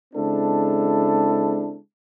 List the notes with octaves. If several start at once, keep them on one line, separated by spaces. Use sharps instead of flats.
C#3 G#3 C4 D4 E4 A4